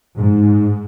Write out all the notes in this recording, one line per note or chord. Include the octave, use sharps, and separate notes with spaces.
G#2